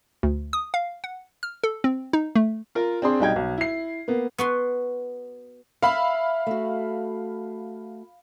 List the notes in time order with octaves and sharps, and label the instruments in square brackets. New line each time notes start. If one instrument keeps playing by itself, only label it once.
[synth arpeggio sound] D2
D#6
F5
F#5
F6
A4
C4
D#4
A3
[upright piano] F4 A#4
C4 D4 G#4 D5 C6
B1 G3 D#4 G5 G#6
B1
E4 C7
A#3 B3
[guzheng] B3 F#4 C6
[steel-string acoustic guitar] E5 [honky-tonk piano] F5 B5
[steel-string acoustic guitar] A3 F#4